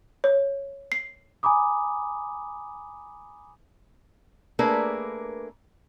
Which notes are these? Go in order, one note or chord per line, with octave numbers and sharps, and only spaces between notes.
C#5
C7
G#5 A#5 B5 D6 D#6
A3 A#3 D4 G#4 A#4 B4